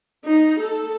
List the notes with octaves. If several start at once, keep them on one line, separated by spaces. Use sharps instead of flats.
D#4
A4